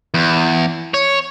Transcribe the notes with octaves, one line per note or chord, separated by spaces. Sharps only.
E2
C#5